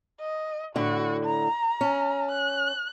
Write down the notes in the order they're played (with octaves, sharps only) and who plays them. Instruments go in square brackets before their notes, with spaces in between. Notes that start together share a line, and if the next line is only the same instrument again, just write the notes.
[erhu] D#5
[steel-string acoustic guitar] A2 D3 [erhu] F#4
[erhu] A#5
[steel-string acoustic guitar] C#4
[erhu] F#6